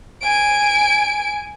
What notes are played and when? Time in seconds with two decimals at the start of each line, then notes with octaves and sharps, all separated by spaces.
0.22 G#5 D7